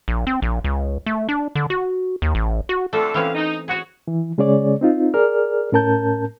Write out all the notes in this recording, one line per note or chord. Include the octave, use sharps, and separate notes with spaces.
A#1
C4
A#1
C#2
A3
D4
D3
F#4
D#2
A1
F#4
F2 D3 A3 A4
A#2 D3 E3 C4 C#4 F5
D#4
F#4 G#4 C#5
E3
C#3 G#3 C#4 G#4 C#5 D5
C4 D#4 F4
G#4 A#4 D5 F6
A2 C#4 A#4 A5 G6